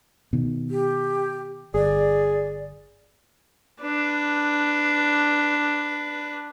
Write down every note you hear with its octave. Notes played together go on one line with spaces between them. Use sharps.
B2 D#3
G4
G1 G#4 D5
D4 B4